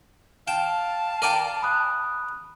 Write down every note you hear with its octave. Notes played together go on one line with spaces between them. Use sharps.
F5 G5 A5 E7
A#4 D5 G5 D#7
B5 D#6 F#6